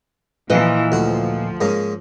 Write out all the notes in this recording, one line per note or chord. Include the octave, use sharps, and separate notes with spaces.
A#2 E3 F3 B4 D#5
D2 F3 F#4
G#2 A#3 C#4